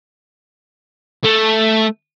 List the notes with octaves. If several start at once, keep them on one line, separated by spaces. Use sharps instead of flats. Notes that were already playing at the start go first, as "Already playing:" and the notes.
A3